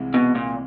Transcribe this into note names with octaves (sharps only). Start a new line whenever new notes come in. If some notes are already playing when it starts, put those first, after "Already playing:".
Already playing: C2 C3 E3 G#3
B2
A#2